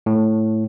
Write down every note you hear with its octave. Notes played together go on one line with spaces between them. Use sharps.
A2